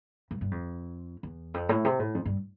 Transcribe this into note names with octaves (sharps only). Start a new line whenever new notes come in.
G2
G2
F2
E2
F2
A2
C3
A2
F2
G2